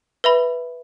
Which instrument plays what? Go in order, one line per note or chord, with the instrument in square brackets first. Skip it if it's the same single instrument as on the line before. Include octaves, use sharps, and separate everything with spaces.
[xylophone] B4 E5 B5